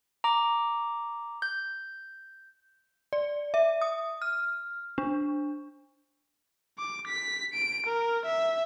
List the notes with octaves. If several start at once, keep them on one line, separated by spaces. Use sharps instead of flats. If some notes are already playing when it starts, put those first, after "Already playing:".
A#5 D6
G6
D5
E5
D#6
F6
D4
D6
B6
D7
A#4
E5